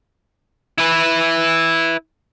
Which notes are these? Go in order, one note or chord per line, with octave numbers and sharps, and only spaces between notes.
E4 B4